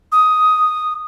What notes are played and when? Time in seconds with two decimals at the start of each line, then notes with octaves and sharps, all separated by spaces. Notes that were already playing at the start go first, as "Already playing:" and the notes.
0.12 D#6